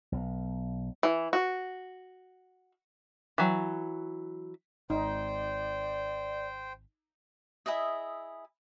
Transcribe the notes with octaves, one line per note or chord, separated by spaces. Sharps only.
B1
E3
F#4
E3 F#3
G#1 D#4 C5 D5 G5
E4 G#4 D#5 E5